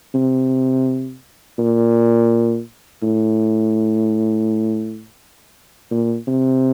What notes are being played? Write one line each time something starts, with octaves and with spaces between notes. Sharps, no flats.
C3
A#2
A2
A#2
C3